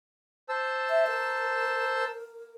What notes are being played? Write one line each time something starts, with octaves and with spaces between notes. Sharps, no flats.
C5 A5 E6
E5
A#4